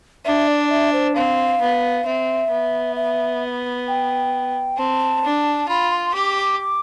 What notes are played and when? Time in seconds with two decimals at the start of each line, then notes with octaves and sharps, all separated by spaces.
0.25 D4 E5
0.48 D5
0.70 E5
0.93 C5
1.15 C4 F5
1.61 B3
2.06 C4 E5
2.51 B3
2.96 E5
3.88 G5
4.77 C4 A5
5.24 D4
5.68 F4 B5
5.92 C6
6.14 G4 D6
6.37 D6
6.59 D6